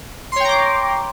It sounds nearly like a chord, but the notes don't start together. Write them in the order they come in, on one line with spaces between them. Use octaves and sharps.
C6 C#5 G5 A#5 D6